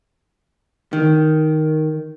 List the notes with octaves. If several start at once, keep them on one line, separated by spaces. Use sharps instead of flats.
D#3